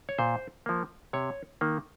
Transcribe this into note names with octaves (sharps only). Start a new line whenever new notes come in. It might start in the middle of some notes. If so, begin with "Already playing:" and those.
C#5
A#2 C5
F3 A#3
C3 C#5
D#3 A#3